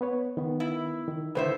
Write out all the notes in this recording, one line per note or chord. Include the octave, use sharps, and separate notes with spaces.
B3 B4 C#5
D#3 B3
E4
D#3
A2 D3 D#3 B4 C5 E5